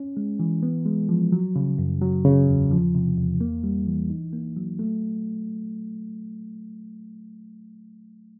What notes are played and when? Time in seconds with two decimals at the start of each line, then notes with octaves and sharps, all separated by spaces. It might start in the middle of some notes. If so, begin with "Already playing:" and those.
Already playing: C#4
0.17 G#3
0.39 E3
0.63 B3
0.86 G#3
1.09 F3
1.32 F#3
1.56 C#3
1.78 F#2
2.01 F#3
2.25 C#3
2.48 E2
2.71 F3
2.95 C3
3.18 E2
3.41 A#3
3.64 G3
3.87 E3
4.10 D#4
4.33 A#3
4.56 F#3
4.79 A3